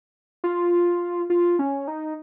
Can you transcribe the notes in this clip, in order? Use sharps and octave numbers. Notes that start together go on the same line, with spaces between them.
F4
F4
C#4
D#4